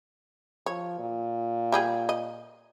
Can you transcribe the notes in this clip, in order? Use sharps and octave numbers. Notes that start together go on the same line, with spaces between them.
F3 C#5
A#2
G3 G4 G#4
D#5